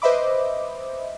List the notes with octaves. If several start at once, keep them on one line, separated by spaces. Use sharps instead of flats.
B4 C5 D#5 E5 B5 D6